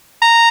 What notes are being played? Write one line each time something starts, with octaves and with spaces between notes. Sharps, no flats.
A#5